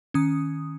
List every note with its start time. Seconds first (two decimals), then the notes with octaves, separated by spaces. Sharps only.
0.14 D#3 C#4 D#6